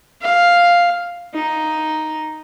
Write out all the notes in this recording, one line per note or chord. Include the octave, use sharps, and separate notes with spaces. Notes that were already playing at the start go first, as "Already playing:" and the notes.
F5
D#4